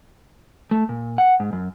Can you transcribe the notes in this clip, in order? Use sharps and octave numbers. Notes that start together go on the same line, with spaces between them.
A3
A#2
F#5
G#2
F#2